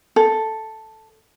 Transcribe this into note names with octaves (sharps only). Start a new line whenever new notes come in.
A4